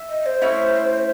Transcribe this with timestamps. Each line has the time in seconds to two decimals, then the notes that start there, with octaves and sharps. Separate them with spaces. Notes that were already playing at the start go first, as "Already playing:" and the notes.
Already playing: E5
0.09 D#5
0.26 C5
0.42 A3 C#4 E4